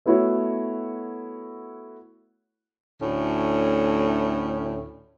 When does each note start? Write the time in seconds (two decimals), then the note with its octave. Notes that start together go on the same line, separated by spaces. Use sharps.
0.06 A3 B3 E4 F#4 C#5
3.01 D2 A2 C#4